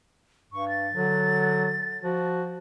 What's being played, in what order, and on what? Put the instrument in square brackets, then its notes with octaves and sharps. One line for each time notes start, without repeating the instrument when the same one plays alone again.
[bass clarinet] G2 [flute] C#6
[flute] A6
[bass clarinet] D3 [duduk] F#3
[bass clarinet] F3 [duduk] F#4